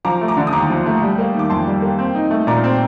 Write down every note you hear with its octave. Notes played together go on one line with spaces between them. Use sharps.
F3 A#5 D6
A3
A#5 D6
D3
D#6
D#2 A#5 D6
F3
A3
G3
A#3
D#3 D6
F2 A5 C6
G3
A#3
C4
D#4
A3
A#2 A#5 D6
C4